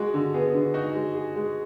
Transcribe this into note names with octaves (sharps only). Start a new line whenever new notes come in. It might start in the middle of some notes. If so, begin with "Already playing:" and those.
Already playing: G#3 F#4
D3
B3 G#4
D3
D#4 F#4
G#3
G#4
G#3